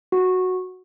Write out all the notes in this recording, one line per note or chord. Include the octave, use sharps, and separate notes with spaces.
F#4